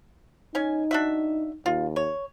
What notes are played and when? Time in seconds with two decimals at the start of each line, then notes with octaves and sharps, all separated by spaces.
0.55 C#4 D#4 G#5
0.91 D4 F#4 E5
1.66 D#2 F4
1.96 C#5